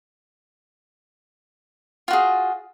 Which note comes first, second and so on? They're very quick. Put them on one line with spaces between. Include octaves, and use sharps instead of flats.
F4 F#4 G#4